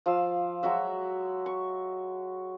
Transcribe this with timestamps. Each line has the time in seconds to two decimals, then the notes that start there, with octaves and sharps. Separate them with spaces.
0.06 F3 F5 E6
0.63 F#3 G#3 F#4 E5
1.46 C#6